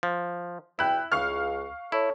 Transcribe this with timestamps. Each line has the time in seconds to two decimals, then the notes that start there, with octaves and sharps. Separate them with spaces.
0.03 F3
0.79 E2 B2 E4 G5 B5 F#6
1.12 C#2 F5 C#6 F6
1.92 E4 A4 C#5